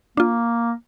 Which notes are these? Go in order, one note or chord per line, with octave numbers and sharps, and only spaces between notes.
A#3 D4 F4